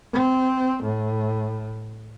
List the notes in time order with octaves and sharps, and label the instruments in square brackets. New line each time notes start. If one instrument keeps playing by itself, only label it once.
[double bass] C4
A2